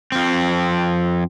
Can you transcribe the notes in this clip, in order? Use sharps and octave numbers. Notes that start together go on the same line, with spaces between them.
F2 C4